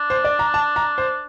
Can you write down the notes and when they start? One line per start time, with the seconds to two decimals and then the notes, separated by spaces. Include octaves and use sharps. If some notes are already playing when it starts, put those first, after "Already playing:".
Already playing: D4
0.10 C5
0.24 D5
0.39 A#5
0.54 A5
0.76 A#5
0.98 C5